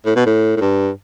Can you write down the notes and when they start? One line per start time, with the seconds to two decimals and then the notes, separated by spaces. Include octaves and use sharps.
0.06 A2
0.16 B2
0.26 A2
0.57 A2
0.61 G2